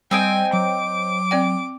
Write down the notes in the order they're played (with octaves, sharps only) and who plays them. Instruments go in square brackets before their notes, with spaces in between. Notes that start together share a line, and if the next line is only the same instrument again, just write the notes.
[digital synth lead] G3 [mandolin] C4 D#5 G5 [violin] G#5
[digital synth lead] F#3 [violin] D6
[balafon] C4 D5 G5